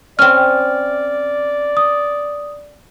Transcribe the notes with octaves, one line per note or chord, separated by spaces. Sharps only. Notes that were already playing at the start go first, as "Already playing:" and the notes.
C4 C#4 D5 F6
D#6